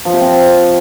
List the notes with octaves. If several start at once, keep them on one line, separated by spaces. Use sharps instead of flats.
F3
C3
C4